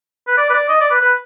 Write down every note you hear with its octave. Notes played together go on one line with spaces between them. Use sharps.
B4
D5
B4
D5
D#5
D5
B4
B4